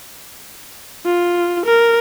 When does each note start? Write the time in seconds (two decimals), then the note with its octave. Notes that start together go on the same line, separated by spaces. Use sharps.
1.05 F4
1.65 A#4